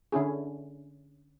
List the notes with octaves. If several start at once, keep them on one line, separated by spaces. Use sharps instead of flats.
D3 C#4 E4 G#4